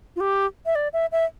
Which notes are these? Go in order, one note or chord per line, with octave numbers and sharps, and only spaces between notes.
F4
G4
E5
D5
E5
E5